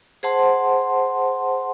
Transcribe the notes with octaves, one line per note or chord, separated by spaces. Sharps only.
G#4 C5 F#5 A5 C6